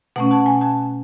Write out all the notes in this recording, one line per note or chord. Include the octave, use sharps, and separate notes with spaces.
B2 A3 C#4 F#5
A5
G#5
A5